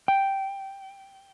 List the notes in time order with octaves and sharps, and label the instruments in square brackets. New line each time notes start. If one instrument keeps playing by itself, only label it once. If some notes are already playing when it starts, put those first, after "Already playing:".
[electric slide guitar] G5